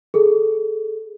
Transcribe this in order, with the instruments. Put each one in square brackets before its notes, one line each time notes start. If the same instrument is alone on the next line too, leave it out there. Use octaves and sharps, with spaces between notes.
[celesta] G#4 A4